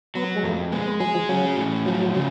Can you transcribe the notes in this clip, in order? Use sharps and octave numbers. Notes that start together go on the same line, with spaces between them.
F#3 B3
G#3
F2 A3
G#3 B3
B3
F#3 G#4
F3
F#3 C#4
A2
F3 F#3
C#3